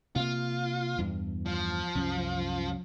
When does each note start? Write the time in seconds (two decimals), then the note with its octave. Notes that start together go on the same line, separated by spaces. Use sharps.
0.16 C3 A#3 F4
0.98 E2 G2
1.46 F3
1.95 C2 F#2 C#4